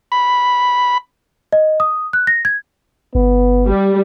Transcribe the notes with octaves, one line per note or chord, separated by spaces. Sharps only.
B5
D#5
D#6
F#6
A#6
G#6
G1 B3
G3